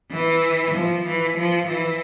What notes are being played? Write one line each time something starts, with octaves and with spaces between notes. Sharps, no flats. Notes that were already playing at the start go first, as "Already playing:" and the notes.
E3
F3
E3
F3
E3